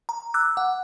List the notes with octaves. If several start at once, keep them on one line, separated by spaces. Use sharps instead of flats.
A#5
D6 E6 F#6
F#5